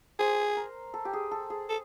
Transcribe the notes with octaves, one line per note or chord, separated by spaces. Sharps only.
G#4 C5
A#4
A4
G4
G#4
A4
G#4
A4